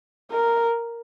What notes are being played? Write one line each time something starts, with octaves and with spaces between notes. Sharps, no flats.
A#4